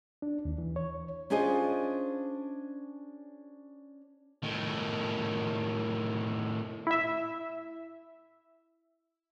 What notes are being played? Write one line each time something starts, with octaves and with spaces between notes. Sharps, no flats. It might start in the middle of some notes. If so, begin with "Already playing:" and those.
D4
D#2
E3
C#5
C#4 D4 F4 G#4 C5 D#5
A2 D#3
E4 E5